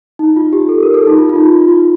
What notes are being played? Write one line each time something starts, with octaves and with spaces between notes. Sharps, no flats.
D#4
F4
G4
A4
A#4
A4
D#4
F4
F4
D#4
F4
F4